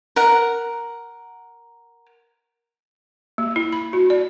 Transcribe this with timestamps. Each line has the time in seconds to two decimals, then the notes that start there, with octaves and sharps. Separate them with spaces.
0.16 A#4 F#5
3.38 A#3
3.56 E4
3.72 B5
3.93 F#4
4.10 D5